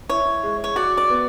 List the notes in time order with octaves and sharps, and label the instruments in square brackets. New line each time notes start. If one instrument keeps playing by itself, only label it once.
[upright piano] E4 [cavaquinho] C#5
[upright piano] G#3
[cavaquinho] C#5
[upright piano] F#4 [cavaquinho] D5
[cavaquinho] D5
[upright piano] B3